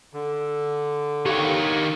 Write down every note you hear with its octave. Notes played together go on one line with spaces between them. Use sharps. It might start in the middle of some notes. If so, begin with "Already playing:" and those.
D3
D#3 G4 C#5 F5 G5